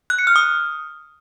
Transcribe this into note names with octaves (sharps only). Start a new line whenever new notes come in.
F#6
C#7
F6
D#6